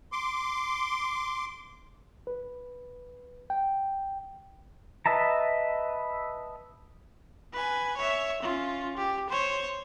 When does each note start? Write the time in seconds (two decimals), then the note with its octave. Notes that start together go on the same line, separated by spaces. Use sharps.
0.12 C6 D6
2.27 B4
3.50 G5
5.06 B4 D#5 E5 A5 A#5
7.53 B4 G#5
7.97 C#5 E5
8.42 C#4 F4
8.97 G4
9.30 C5 C#5